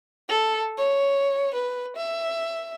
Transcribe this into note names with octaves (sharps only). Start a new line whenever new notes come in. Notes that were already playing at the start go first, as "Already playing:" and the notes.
A4
C#5
B4
E5